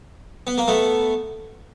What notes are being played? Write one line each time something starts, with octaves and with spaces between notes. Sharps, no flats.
B3
A#3
A3 B3